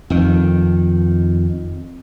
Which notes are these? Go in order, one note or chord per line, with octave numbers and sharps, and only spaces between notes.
F2 D#3